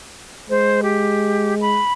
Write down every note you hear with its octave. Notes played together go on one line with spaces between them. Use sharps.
G#3 C5
G4
B5